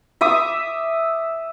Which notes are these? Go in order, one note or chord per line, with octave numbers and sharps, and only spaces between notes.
E5 D6 D#6